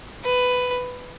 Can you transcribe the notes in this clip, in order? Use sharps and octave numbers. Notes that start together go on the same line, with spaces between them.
B4